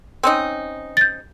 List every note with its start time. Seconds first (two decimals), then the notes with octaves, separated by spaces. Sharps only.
0.23 C4 C#4 D#4
0.97 G6 A6